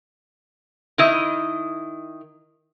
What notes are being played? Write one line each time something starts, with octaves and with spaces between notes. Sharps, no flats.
D#3 E4 D#5